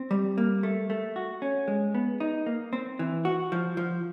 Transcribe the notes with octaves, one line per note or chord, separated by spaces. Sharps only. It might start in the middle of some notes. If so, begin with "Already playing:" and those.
Already playing: C4
G3
A#3
A3
A3
F#4
C#4
G#3
B3
D#4
A#3
C4
E3
F#4
F3
F3